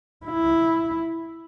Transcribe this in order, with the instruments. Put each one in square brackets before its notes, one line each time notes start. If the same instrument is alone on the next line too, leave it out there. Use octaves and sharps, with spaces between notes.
[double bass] E4